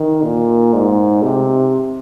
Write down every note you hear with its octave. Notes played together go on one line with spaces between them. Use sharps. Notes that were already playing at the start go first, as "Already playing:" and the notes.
Already playing: D#3
A#2
G#2
C3